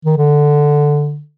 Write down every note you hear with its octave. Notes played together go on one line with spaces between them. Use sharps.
D#3
D3